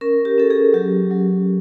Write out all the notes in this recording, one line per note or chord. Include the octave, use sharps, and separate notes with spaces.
C#4 A#4
G4
C#4 A4
G#4
F#3 G4
F#3